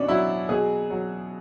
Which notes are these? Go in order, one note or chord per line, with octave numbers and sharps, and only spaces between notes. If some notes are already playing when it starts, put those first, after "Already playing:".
Already playing: B2 C#4 D4
F#3 E4
B2 G#4
F#3